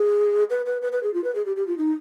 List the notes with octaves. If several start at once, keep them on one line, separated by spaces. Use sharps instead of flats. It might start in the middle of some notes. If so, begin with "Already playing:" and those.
Already playing: G#4
B4
B4
B4
B4
G#4
F4
B4
G#4
G4
G4
F4
D#4